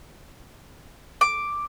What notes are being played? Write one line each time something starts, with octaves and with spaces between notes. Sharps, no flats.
D6